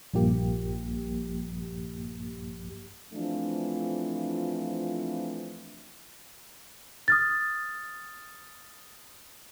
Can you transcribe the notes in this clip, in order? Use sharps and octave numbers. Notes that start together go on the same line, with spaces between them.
A#1 G2 F3 A#3 G4
E3 F3 A3 C4 D4 F4
D#6 F6 A6